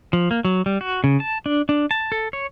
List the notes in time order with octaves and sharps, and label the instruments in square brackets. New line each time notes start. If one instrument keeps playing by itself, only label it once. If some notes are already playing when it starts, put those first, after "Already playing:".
[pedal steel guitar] F3
A#3
F#3
G3
F#4
C#3
A5
D4
D4
A5
A4
C#5